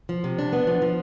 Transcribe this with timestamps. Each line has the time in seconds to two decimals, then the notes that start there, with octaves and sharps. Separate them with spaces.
0.09 F3
0.24 C3
0.38 D4
0.53 B3
0.67 F3
0.82 F3